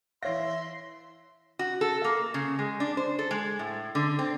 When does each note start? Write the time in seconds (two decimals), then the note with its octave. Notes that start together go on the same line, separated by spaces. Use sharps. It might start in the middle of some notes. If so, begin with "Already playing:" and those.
0.23 E3 C#5 E5 F5 C6 A#6
1.59 F#4
1.81 A4
2.04 A#3
2.34 C#3
2.59 G#3
2.80 D4
2.97 C5
3.19 A4
3.31 G#3
3.59 A2
3.95 D3
4.19 C4